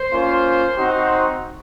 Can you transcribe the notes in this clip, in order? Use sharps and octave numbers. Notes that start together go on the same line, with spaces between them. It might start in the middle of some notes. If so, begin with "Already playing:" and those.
Already playing: C5
A#3 C#4 F4
C4 D#4 F#4